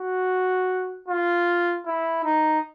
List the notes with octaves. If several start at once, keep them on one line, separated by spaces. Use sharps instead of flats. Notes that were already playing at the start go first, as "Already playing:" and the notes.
Already playing: F#4
F4
E4
D#4